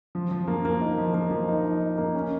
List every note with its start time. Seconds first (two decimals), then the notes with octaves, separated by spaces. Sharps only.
0.15 F3
0.31 F3
0.48 A#3
0.65 A#3
0.81 D#4
0.98 F3
1.14 A#3
1.31 F3
1.48 D#4
1.65 D#4
1.81 D#4
1.98 A#3
2.15 C#4